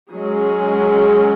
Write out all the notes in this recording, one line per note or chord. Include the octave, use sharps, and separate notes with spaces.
F#3 G#3 C#4 G#4